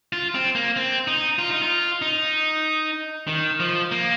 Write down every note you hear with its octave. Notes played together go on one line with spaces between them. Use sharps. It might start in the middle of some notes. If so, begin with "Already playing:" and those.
F4
C4
A#3
C4
D#4
F4
D#4
F4
D#4
D#3
F3
A#3